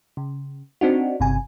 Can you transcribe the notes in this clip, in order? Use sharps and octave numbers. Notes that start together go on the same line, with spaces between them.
C#3
C4 D4 D#4 F#4
G1 C3 G#5